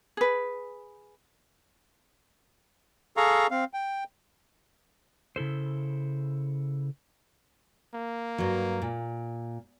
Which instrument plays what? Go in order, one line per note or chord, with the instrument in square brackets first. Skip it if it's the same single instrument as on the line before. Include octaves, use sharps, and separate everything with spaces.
[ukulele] G#4 B4
[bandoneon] G#4 A4 F5 A#5 C#6
C4 F5
G5
[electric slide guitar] C#3 E4 A4 C5
[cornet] A#3
[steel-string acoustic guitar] G2 F#3
A#2